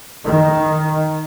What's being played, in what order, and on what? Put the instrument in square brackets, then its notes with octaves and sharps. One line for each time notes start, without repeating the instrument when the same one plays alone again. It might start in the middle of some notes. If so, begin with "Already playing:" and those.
[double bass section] D#3